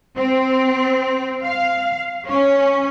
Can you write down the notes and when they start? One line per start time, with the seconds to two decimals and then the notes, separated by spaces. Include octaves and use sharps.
0.17 C4
1.45 F5
2.31 C#4